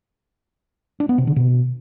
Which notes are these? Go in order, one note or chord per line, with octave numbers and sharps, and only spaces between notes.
D4
B3
C3
D3
B2